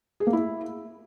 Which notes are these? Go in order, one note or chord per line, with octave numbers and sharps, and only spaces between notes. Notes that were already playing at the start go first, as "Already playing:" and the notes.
G#4
A#3
E4